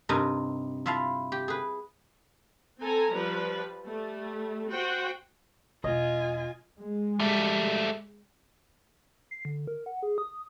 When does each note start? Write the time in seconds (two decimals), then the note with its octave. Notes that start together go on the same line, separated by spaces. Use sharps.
0.09 G2 C3 D#4 A#4
0.86 E4 F4 E5 F5 A5
1.32 G4
1.48 G#4 B4
2.80 C4 A4 G#5 A#5
3.12 F3 G3 B4
3.84 G3 A3
4.71 F#4 C5 F#5 G5
5.84 E1 F4 D#5 G#5
6.78 G#3
7.20 G3 A3
9.31 C7
9.45 D3
9.67 A#4
9.86 F#5
10.03 G#4
10.18 D#6